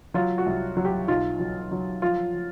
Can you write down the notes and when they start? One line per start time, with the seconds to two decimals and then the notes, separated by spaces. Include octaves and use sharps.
0.14 F#3 F4
0.38 F#4
0.46 C2
0.77 F#3
0.85 G4
1.08 B1 F4
1.39 F#3
1.71 F#3
2.02 F3 F4
2.34 F3